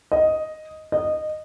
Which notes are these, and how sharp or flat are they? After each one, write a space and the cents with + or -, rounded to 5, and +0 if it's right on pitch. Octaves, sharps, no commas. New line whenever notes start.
D#5 +5
D#5 -15